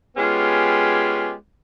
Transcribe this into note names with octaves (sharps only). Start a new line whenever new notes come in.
G#3 B3 C#4 F4 G4